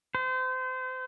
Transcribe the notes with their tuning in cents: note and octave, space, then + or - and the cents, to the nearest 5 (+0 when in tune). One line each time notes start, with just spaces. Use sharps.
C5 -30